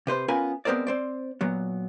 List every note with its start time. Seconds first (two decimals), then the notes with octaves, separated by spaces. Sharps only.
0.07 C3 B4 C5
0.28 B3 C#4 F4 A#4 B4 G#5
0.65 G#3 B3 C4 A#4 C5 D5
0.87 C4 C5 D5
1.41 A#2 F#3 B3